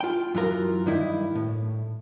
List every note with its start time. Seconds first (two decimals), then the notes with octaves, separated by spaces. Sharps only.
0.01 F4 G5
0.35 F#2 E3 F4 A#4
0.86 G2 D#3 E4
1.35 A2